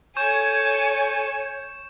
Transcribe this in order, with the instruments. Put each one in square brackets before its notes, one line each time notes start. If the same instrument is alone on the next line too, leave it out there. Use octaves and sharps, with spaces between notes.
[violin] A4 G#5 [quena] C#5 [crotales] C#6 G6 E7